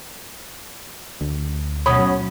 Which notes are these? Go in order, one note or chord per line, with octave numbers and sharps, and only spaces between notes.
D2
F#2 B2 C#4 B5 D#6
F#3